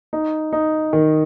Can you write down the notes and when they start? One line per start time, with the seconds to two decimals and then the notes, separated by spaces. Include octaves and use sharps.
0.13 D#4
0.53 D#4
0.93 D#3